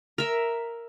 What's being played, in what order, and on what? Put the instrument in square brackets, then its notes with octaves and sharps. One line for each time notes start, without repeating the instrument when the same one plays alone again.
[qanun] A#4 E5